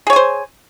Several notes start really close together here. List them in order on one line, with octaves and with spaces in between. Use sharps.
G#4 C#5 G#5 C5